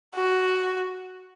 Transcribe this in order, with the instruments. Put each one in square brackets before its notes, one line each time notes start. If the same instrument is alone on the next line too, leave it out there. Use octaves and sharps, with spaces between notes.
[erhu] F#4